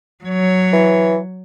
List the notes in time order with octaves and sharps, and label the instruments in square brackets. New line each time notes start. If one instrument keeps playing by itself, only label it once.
[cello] F#3 C#5
[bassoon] E3